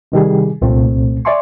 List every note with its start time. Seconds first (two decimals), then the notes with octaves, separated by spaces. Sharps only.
0.12 C3 D#3 G3 G#4
0.61 C2 A#2 A3 C4
1.25 D5 E5 G#5 C6 C#6